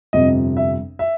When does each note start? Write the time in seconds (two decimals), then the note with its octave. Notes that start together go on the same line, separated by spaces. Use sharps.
0.13 G1 F2 C3 D#5
0.57 E5
0.99 E5